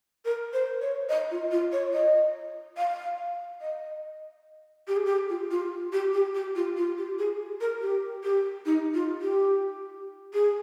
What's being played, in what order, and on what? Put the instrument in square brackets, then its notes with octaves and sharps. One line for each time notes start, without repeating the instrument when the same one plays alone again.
[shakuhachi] A#4
C5
C#5
D#5
F4
F4
C#5
D#5
F5
D#5
G4
G#4
G4
F4
F4
G4
G4
G4
F4
F4
G4
G#4
A#4
G4
G4
D#4
F4
G4
G#4